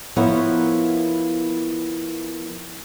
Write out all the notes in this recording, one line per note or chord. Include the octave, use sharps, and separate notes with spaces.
F3 B3 E4 A#4 C#5